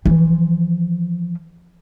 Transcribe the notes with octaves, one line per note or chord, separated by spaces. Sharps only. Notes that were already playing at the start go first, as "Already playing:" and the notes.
E3 F3